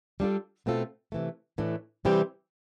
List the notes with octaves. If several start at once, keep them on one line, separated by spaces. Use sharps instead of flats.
G3 D4 F4 A4
B2 A3 C4 F4 A4
C3 E3 A3
A2 E3 A3 D4
C3 E3 G3 C4 G4